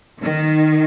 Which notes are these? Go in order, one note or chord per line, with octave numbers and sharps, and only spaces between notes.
D#3